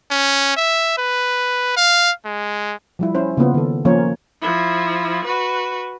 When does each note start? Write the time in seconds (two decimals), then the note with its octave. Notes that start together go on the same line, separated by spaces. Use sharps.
0.11 C#4
0.57 E5
0.98 B4
1.77 F5
2.25 G#3
2.99 F3 G3 E4
3.15 C#4 E4 C5
3.37 C#3 A#3 B3 F4
3.54 D#3 A4
3.85 F3 A#3 C#4 A#4 C5 C#5
4.41 F3 E4
5.25 F#4 B4